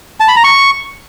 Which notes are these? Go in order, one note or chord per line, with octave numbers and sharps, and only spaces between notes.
A5
B5
A#5
C#6